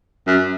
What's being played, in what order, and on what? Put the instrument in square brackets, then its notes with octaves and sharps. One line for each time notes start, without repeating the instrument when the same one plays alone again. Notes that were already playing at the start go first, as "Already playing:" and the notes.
[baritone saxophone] F#2